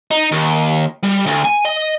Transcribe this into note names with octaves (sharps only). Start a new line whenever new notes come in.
D#4
D#2
G3
D2
G#5
D#5